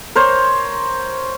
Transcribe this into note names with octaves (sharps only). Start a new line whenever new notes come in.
A#4 C5 C#5